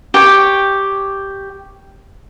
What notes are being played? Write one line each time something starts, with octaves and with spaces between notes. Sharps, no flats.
G4 C#5 G5